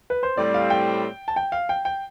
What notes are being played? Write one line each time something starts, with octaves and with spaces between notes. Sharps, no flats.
B4
C5
A2 G3 C4 D5
F5
G5
A5
G5
F5
G5
G5